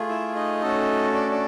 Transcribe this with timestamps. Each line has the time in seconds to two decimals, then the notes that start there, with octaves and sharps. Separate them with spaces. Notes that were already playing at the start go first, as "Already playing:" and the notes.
Already playing: A3 F4 G#4
0.09 E4 E5
0.35 D#4 D#5
0.61 A3 C#4 F#4 A4
1.14 D4 D5
1.31 D4 D5